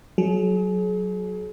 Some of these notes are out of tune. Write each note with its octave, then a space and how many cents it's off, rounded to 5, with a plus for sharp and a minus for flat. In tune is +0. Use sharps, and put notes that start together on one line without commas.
F#3 +0 G#4 +40